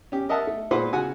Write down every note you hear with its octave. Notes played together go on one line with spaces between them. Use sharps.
C#4 G4
A#4 D#5 E5 F#5 A5
A3
A#2 G#3 B4 C5 F#5 C6
C#3 F#4 F#5 G#5